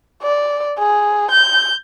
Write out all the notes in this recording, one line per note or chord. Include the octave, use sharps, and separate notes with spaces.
D5
G#4
G6